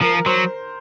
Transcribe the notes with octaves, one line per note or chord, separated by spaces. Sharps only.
F3 A#4
A#4
F#3 C5